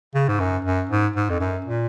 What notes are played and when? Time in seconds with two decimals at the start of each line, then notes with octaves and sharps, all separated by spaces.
0.15 C#3
0.28 G#2
0.40 F#2
0.65 F#2
0.90 G#2
1.16 G#2
1.30 F2
1.40 F#2
1.65 A#2